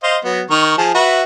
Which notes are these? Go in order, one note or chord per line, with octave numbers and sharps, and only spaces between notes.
C5 D#5 F5
F#3 B3
D#3 A#4 C#6
F3 G#4 A5
F#4 B4 E5